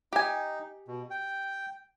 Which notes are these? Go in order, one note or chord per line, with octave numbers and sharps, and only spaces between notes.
D#4 G4 G#5
B2
G5